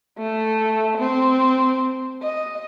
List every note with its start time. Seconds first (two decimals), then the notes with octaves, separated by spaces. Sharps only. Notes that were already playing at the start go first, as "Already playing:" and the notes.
0.18 A3
0.97 C4
2.22 D#5